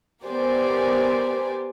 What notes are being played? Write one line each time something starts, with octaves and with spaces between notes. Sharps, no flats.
B3 G4 A#4 C5 D5 G#5